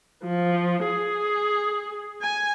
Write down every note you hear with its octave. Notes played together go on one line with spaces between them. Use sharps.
F3
G#4
G#5